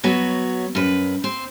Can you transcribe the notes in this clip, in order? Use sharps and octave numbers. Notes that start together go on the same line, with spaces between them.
F#3 B3 F#4 C#5
F#2 B4
C4 C5